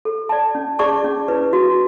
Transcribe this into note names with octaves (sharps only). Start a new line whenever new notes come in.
A4
D5 A5
C#4
G#4 D5 A5 C#6
C#4
E4 B4
F#4